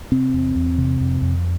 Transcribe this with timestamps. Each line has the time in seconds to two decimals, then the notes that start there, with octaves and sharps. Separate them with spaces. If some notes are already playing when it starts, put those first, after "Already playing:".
0.12 C3 C4
0.33 E2
0.56 E2
0.78 C3
1.01 F2
1.22 F2